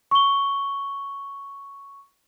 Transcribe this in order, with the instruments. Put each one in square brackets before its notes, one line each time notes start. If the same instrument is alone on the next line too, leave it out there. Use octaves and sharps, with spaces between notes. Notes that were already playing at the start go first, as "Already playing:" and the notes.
[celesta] C#6 G7